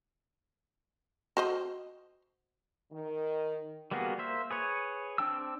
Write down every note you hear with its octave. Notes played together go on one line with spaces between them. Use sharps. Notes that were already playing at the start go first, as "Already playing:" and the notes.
F#4 C5 D#5
D#3
G3 A#3 B3 F#4 G#4
A#3 C5 E5
G#4 B4 C#5
C4 D4 G5 A5 E6